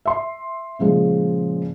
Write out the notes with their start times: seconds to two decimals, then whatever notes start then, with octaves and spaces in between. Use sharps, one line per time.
0.05 E5 C6
0.79 A#2 C#3 F3 G#3